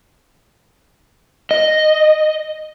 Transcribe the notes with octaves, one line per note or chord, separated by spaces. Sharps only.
D#5